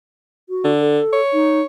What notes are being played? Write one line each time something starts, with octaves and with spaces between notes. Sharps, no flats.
F#4
D3
A4
C#5
D#4